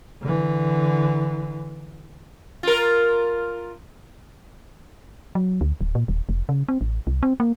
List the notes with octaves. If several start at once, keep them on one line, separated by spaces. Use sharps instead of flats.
D3 E3
F4 A#4
F#3
D2
D1
A#2
D#1
F1
C#3
C4
A1
C2
C4
A#3